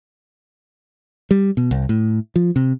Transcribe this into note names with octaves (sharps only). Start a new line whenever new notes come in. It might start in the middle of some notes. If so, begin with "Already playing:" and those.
G3
B2
C2
A2
F3
C3